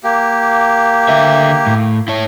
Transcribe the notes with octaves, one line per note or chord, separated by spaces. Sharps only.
A#3 G4
D3 E5
A2
E4 C#5